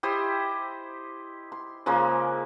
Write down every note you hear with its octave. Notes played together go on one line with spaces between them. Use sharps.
E4 G4 C5 D#5
C6
C#3 F3 G#3 A#3